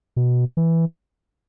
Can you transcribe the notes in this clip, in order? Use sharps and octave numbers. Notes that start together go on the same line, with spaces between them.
B2
E3